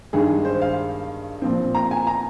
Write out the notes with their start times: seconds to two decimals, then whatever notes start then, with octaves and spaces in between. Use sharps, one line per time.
0.13 G2 D#3 G#3 G#4
0.45 C5
0.62 F5
1.42 A#2 F3 C4
1.75 A#5
1.91 G#5
2.07 A#5